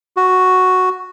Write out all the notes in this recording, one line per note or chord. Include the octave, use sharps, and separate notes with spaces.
F#4